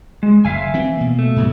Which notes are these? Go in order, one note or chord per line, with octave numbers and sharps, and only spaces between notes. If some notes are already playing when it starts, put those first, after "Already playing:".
G#3
F#1 E5 F5 G#5
E3 C4
B2 A#3
A3
G#2 B2 F#3